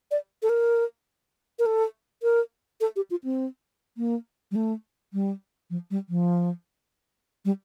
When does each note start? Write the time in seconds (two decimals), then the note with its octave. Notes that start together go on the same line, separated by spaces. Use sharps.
0.11 D5
0.43 A4
0.49 A#4
1.59 A#4
1.66 A4
2.23 A#4
2.81 A4
2.96 G4
3.11 F4
3.24 C4
3.97 A#3
4.51 G3
4.56 A3
5.13 G3
5.70 F3
5.91 G3
6.09 F3
7.45 G3